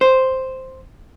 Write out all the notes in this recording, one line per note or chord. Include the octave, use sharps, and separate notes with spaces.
C5